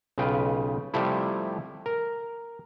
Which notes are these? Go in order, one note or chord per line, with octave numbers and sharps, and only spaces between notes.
B1 C#3 F4 B4 G5
C3 F3 G3 A3 E4
A#4